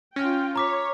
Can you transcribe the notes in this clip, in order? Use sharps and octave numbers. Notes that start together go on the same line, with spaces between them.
C#4 F4 G5 F6 A#6
C#5 A#5 D6 B6